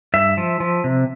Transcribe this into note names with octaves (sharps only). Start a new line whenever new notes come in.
G2 E5
F3
F3
C3